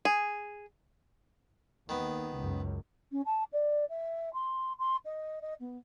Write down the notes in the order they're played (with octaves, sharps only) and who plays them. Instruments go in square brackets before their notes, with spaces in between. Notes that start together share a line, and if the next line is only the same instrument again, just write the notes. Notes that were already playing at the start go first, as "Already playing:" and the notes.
[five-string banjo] G#4
[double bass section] D#2 [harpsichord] D#3 B3
[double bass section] C#2 F#2
[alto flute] C#4
A5
D5
E5
C6
C6
D#5
D#5
B3